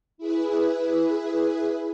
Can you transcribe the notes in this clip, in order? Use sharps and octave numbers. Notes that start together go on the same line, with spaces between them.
E4 G#4 B4